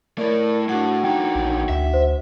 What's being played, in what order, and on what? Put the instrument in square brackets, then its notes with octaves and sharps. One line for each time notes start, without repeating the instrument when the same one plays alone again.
[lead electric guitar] A3 E4 [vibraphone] A#4 D5
[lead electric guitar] A2 [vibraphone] D4 F#4 F#5
[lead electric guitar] E2 D#4 [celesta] G5
[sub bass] A#1
[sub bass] D2 [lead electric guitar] E5
[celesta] C5